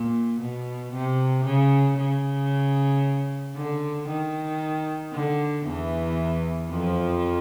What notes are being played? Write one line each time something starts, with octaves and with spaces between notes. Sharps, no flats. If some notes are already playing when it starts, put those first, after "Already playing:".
Already playing: A#2
B2
C3
C#3
C#3
D3
D#3
D3
E2 E3
F2 F3